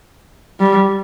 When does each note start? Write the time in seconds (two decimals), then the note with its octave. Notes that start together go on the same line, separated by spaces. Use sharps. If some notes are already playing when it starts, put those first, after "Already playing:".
0.60 G3